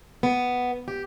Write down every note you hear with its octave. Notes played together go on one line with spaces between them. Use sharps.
B3
G4